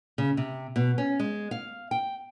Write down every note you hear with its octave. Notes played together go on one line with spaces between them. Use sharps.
C#3
C3
B2
C#4
G#3
F5
G5